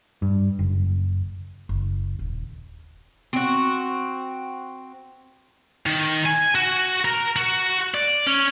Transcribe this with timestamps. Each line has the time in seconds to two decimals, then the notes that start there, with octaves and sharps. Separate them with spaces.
0.22 G2
0.59 F#1
1.69 F#1
2.19 D#1
3.33 C4 F#4
5.86 D#3
6.26 G#5
6.55 F#4
7.05 A#4
7.36 F#4
7.95 D5
8.27 C#4